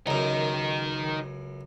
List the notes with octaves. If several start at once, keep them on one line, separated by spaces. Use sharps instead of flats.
C#2 F#2 D#4 A#4